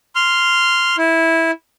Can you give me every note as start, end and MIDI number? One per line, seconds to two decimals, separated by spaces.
0.15 0.96 84
0.15 0.96 89
0.98 1.51 64